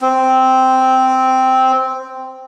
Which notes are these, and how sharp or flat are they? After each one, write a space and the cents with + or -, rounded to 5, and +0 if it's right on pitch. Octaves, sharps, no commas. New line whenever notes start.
C4 -5